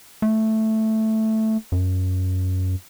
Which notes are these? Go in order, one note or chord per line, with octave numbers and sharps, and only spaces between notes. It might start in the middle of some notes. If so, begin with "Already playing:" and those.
A3
F#2